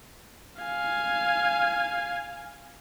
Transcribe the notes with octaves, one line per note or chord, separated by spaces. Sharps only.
F5 G#5